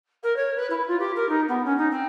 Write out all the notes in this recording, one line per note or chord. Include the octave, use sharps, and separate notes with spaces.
A#4
C#5
B4
E4
F4
G4
A#4
D#4
B3
C#4
D#4
C4